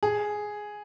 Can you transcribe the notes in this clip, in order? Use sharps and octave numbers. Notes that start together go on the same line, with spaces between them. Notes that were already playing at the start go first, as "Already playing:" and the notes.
G#4